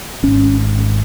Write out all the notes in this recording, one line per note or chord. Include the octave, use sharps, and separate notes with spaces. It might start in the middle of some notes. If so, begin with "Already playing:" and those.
G#1 G#2 C#4